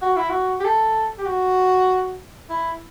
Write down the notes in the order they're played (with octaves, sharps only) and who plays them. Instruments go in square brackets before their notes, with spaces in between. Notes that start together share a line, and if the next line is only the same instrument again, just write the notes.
[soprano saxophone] F#4
E4
F#4
G4
A4
G4
F#4
E4